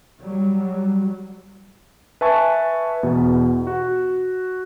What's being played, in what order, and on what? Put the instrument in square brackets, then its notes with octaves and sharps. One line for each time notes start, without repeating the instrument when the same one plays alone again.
[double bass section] F#3 G3
[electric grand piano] B4 E5 G#5 A5 C#6
E2 B2
F#4